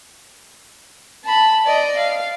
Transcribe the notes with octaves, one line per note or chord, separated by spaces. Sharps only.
A5 B5
D5 D#5
F5